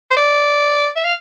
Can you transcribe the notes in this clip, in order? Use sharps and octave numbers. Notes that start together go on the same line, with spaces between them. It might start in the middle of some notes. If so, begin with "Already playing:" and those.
C5
D5
E5
F5